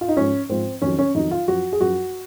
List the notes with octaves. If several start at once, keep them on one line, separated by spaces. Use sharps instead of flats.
F4
D#4
G#2 F3 C#4
G#2 F3 C4
F2 D#3 F#3 C#4
C#4
F2 D#3 F#3 D#4
F4
F#2 F3 F#4
G#4
F#2 F3 F#4